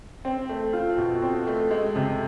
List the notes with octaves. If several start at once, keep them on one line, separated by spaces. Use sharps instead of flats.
C4
A3
F4
B2
C4
A3
G#3
C3